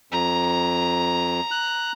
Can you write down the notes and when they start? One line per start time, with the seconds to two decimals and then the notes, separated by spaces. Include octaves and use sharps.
0.12 F2 A#5
1.51 F#6